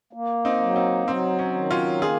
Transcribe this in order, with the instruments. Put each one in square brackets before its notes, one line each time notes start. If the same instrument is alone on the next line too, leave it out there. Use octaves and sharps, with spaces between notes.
[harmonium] A#3
[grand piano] C4 D#4
[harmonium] F#3
[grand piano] C4 D#4
[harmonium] F#3 [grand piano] C4
[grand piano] C#4
[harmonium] D#3
[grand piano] C#4 F4
[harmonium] A#3 [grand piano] F4 G#4